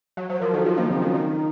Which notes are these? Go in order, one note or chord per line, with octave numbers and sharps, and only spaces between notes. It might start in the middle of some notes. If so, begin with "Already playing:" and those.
F#3
F#3 C5
F3 A#4
D#3 A4
F3 F4
F3 A#3
C#3 C4
D#3
D#3 D#4